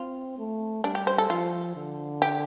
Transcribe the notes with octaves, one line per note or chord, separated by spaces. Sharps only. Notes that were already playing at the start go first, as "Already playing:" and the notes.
Already playing: C4 F4
A3
G3 D4
G4
C5
A4
F3 F4
D3
G4